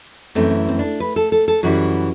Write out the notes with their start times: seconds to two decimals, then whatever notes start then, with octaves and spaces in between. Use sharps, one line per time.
0.35 F#2 E3 A3 C4
0.69 C4
0.79 D4
1.00 B4
1.16 A4
1.32 A4
1.48 A4
1.63 F#2 E3 G3 F#4